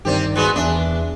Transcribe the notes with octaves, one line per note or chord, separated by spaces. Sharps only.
G2 C3 D#3 C4 G4 D5
G#3 B3 F#4
E2 D4 E5